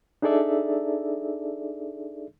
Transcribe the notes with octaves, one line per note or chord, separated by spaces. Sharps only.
D4 D#4 G#4 A4 D5 E5